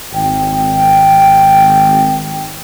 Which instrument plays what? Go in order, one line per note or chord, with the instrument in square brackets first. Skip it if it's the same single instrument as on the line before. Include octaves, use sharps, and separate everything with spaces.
[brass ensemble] G#1 G5